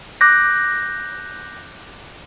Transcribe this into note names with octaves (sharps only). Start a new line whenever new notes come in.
D6 F#6 G6 A#6